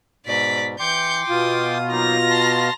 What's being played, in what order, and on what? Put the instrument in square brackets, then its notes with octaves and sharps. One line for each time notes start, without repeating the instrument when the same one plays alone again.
[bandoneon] G#2 B2 [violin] D5 B6
[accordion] E3 [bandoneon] G5 C6 D6 [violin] G6 C#7
[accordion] B2 F4 [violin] D#6
[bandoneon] F#3 A#3 D#4 [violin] A#5 A#6
[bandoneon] A5 C6